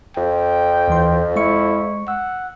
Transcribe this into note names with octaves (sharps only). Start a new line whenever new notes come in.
F2 G5
D#2 E3 C6
G#3 E4 C#6 C#7
F#5 E6